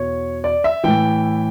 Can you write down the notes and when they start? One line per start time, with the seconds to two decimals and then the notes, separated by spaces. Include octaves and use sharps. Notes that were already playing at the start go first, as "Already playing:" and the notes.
Already playing: E2 B2 C#5
0.44 D5
0.64 E5
0.84 A2 E3 G5